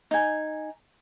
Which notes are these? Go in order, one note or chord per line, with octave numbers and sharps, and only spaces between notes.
D#4 G#5